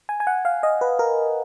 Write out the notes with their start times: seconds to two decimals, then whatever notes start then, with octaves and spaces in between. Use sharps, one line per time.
0.09 G#5
0.20 G#5
0.27 F#5
0.45 F5
0.63 D#5
0.81 B4
0.99 A#4